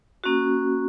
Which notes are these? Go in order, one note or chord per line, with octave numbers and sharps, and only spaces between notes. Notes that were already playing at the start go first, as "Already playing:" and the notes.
A#3 C#4 F#4